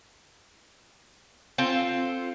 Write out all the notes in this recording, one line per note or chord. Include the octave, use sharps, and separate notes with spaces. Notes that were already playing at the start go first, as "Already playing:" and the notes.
C4 F4 A4